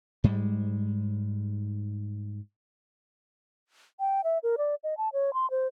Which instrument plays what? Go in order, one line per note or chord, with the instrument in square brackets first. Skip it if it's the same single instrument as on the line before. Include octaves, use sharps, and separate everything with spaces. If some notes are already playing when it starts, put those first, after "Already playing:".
[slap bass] G#2 G3 G#3
[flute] G5
E5
A#4
D5
D#5
A5
C#5
C6
C5